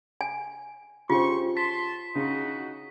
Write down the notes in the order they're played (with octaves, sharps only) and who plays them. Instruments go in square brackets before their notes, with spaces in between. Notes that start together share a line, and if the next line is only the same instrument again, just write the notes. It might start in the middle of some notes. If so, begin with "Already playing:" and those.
[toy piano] G#5
[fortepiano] C#3 G4 C5 [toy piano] F4 [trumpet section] C6 C#6
[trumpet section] A5 C6 [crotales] B6
[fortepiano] C#3 [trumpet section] D#4 F#4